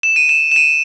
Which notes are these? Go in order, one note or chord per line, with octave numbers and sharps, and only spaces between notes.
E7
D#7
E7
E7
D#7